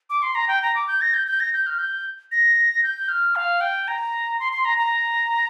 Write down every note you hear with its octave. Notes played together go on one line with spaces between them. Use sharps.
D6
C6
A#5
G5
A#5
D6
G6
A#6
G6
G6
A#6
G6
F6
G6
A#6
G6
F6
F5
G5
A#5
C6
C6
A#5
A#5